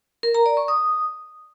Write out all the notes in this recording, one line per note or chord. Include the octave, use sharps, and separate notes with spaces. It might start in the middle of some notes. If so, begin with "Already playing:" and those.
A#4
A#5
D5
C#6
D#6